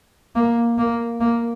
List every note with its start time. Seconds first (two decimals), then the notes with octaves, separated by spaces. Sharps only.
0.35 A#3
0.78 A#3
1.20 A#3